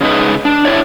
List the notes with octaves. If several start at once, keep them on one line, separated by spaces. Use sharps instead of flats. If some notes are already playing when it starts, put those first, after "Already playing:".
C#3 G#3 D#4 B4
D4
D4 E4 C#5 D5